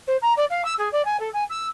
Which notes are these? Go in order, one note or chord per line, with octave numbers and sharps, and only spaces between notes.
C5
A#5
D5
F5
E6
G#4
D5
G#5
A4
G#5
E6